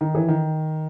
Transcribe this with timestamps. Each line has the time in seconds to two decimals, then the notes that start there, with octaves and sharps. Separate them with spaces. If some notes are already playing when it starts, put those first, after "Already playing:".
0.01 D#3
0.15 E3
0.28 D#3